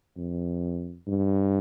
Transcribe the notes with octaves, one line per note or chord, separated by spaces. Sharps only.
F2
G2